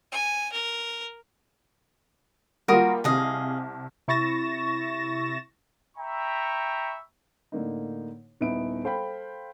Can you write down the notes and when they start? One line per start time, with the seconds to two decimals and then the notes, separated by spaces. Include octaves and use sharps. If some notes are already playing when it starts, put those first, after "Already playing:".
0.12 G#5
0.53 A#4
2.68 G3 A#3 F4 F#4 A#4 D#6
3.04 C2 C3 G#4 D#5 F5
4.08 C3 E4 C#6 A6 A#6 E7
5.97 E5 G5 A#5 B5 C#6
7.52 A2 D3 A#3 D#4
8.41 D#1 B3 D#4 E4 D7
8.84 A4 C5 F5 G5 B5